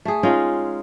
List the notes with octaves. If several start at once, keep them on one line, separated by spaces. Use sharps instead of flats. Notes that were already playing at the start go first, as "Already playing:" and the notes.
A3 G#4
G#3 C#4 D#4 F4